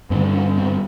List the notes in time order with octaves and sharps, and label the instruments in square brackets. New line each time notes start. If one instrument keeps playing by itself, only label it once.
[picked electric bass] G2 C4
D3
C#4
C4